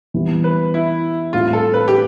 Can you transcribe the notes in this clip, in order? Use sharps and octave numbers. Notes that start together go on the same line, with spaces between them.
E3 G3 B3
B4
E4
A2 G3 C4 F4
A4
B4
G4